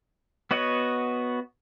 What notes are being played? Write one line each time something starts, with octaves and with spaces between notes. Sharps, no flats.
B3 F#4 C#5 D#5 F#5